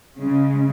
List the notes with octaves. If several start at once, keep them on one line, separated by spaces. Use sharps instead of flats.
C#3 G#3